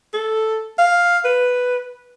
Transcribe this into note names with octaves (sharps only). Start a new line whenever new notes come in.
A4
F5
B4